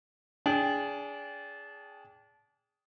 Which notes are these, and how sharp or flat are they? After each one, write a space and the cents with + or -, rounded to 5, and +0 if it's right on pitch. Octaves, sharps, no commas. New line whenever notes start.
D4 -30 G#4 +0 G5 +0